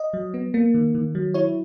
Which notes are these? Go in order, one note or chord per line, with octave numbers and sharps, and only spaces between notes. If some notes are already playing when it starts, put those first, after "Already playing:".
Already playing: D#5
F#3
B3
A#3
D#3
D#3
F#3
E4 C#5